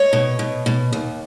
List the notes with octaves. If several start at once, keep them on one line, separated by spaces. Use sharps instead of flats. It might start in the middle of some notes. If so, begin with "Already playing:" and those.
Already playing: C#5 D#5
B2
B2
B2
D#2